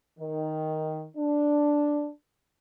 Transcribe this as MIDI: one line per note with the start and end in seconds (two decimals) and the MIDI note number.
0.19 1.03 51
1.15 2.08 62